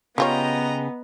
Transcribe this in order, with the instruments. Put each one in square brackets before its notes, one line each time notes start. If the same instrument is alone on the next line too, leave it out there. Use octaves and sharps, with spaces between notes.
[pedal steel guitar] C#3 G5 [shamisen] G3 F4 C#5 [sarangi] B3 [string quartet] D#5 A#5